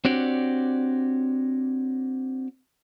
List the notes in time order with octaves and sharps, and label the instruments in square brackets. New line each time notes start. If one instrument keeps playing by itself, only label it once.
[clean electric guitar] C4 D4 F#4 G4 C#5 D5